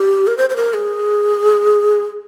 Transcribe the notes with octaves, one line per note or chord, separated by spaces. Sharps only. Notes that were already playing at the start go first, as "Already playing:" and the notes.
Already playing: G4
A#4
C5
C5
A#4
G#4